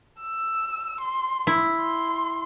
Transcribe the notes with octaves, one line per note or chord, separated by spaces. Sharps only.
E6
C6
E4
C6